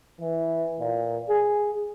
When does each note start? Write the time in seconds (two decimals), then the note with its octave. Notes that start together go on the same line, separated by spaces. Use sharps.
0.19 E3
0.79 A#2
1.27 G#4